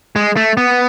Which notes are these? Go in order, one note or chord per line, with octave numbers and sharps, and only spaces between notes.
G#3
A3
B3